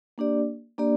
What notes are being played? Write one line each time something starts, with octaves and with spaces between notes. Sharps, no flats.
A#3 D4 G4 D5
A#3 D4 G4 D5